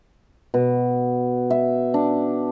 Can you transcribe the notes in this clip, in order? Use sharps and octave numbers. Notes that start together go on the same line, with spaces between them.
B2
E5
D4